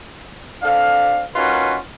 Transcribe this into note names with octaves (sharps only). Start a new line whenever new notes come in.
C4 D4 A4 F5
C#4 D#4 F4 F#4 A#4 B4